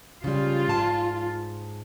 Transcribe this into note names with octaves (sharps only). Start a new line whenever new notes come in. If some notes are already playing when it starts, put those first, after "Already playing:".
C#3 G3 F4
G#2 A5